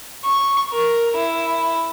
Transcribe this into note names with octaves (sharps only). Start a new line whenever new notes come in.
C#6
A#4
E4